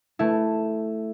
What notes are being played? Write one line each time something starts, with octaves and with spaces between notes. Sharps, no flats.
A3 E4